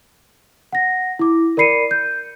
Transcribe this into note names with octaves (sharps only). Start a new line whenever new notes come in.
F#5 A#6
E4 D6
A#4 D5 B5 C7 C#7 D#7
G6